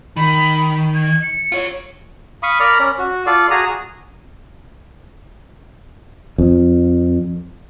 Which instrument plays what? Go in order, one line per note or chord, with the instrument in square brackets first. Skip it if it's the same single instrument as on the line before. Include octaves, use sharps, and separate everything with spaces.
[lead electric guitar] D#3 [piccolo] B5
[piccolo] G#6
C#7
[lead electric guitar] F4 C#5
[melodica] F5 B5 C#6 D#6
A#4 D5 A#5 B5
C#4
F#4
F4 A4 D5 F5
F#4 G#4 A#5 D#6
[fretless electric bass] F2